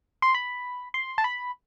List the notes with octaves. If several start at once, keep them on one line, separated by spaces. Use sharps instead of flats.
C6
B5
C6
A5
B5